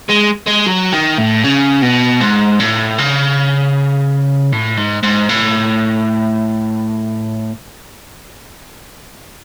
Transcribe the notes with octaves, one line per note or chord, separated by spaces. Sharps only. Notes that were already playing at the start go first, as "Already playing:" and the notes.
G#3
G#3
F#3
D#3
A2
C#3
B2
G#2
A2
C#3
A2
G#2
G#2
A2